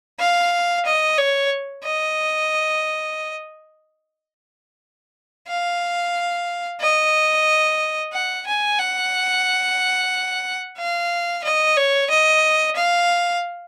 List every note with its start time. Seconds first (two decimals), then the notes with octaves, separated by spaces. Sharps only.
0.19 F5
0.86 D#5
1.18 C#5
1.85 D#5
5.48 F5
6.81 D#5
8.13 F#5
8.47 G#5
8.79 F#5
10.78 F5
11.44 D#5
11.77 C#5
12.10 D#5
12.77 F5